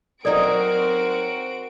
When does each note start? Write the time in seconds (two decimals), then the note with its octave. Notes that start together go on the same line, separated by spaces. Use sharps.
0.25 F#3 C4 D#4 F#4 A4 A#4 D5 D7